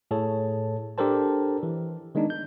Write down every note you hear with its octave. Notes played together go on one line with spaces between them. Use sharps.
A2 G#4 A4 C#5 A5
D4 G4 A4 A#4 C5 A5
E3
D#3 G#3 B3 D4 D#4
G6